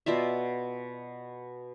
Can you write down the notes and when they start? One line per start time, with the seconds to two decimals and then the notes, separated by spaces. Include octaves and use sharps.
0.06 B2 F4 D5 E5